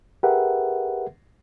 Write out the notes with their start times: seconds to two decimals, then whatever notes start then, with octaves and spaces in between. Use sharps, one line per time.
0.23 G4 G#4 A#4 B4 E5 F#5